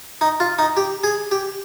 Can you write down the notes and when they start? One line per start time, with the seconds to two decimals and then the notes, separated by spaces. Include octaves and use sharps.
0.21 D#4
0.40 F4
0.59 D#4
0.77 G4
1.04 G#4
1.31 G4